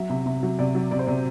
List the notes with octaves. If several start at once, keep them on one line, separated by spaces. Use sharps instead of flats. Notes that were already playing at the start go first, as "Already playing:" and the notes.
Already playing: F#3 E5
C3
C3
F#3
C3 D5
F#3
C3 D5
C5
C3 D5